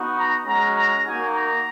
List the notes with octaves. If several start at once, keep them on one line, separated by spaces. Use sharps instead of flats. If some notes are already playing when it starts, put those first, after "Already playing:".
Already playing: B3 D#4 F#4
A#5
G#3 C#4 F#4 A#5
A#5
A#3 D#4 F#4 G#5
A#5